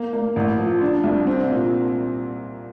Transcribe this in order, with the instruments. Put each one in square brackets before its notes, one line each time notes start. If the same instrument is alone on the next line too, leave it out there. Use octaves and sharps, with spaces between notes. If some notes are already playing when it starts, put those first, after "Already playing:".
Already playing: [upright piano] A#3
A#3
A1
F3
D4
C2
C4
A#2